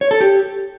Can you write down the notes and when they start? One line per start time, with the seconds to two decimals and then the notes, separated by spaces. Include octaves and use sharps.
0.01 C#5
0.11 A4
0.21 G4